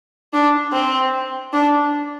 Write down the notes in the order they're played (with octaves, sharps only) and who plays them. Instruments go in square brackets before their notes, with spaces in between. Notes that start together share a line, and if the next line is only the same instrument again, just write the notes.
[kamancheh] D4
C4
D4